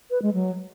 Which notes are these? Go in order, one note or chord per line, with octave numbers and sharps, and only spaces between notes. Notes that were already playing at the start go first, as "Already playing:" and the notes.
B4
G#3
F#3